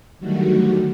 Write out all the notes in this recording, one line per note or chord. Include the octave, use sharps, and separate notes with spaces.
D3 D#3 F#3 G3 A3 F#4